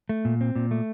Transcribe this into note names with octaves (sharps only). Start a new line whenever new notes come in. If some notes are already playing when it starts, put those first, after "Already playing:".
A3
A#2
C4
A#2
A3